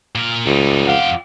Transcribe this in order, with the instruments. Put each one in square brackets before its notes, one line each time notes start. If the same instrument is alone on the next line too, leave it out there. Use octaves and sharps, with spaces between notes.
[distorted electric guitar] A#2 A#4
[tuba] C#2 [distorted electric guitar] G3 D#4
[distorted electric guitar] F2 G4 [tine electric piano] F5 F#5